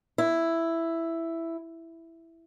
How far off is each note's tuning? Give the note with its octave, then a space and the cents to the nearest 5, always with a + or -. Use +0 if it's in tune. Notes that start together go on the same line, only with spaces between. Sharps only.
E4 +5